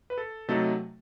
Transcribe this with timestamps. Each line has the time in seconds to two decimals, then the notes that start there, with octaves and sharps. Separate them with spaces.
0.10 B4
0.18 A4
0.48 C3 F#3 A3 D#4 A4